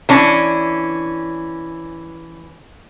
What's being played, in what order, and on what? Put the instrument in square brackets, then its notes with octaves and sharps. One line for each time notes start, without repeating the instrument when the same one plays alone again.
[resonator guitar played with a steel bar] E3 C#4 D4